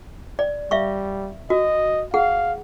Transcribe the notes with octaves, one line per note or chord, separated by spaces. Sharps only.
D5
G3 E5 F5 C#6
F#4 D#5
G#4 F5 F#5